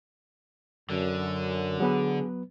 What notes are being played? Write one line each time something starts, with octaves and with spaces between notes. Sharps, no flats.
F#2 D3
F#3 B3 G#4 B4